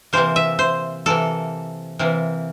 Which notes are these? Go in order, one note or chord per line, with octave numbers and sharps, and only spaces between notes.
C3 E3 A#3 C5
E5
C5
C3 E3 A#3 A4
C3 E3 A#3